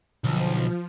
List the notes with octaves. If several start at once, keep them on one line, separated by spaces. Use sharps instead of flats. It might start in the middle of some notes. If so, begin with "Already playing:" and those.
B1 D3 F3